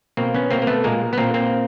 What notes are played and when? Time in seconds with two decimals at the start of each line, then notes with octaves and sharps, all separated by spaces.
0.17 B2 A#3 C4
0.34 B3 C#4
0.51 B2 A#3 C4
0.62 A#3
0.67 A3 B3
0.84 A#2 G#3 A#3
1.13 B3
1.18 A#2 A#3 C4
1.34 A#3 C4